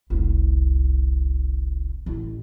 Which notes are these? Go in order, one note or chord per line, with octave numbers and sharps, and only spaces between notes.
F1 C2
A1